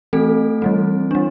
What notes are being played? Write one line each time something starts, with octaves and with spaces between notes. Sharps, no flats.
E3 A3 C4 A4
E3 G3 C4
G3 D4